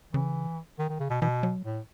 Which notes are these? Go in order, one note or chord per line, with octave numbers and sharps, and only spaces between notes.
C#3 E3
D#3
D#3
C#3
B2
B2 E3
F#3
A2